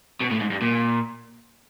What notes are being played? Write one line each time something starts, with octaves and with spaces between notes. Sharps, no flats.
B2
A2
G#2
G2
A#2